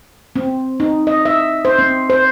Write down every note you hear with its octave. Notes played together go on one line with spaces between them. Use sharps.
C4
D#4
D#5
E5
C5
C4
C5